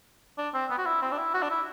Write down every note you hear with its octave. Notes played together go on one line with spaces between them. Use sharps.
D4
C4
B3
F#4
E4
C4
D4
E4
F#4
D4
E4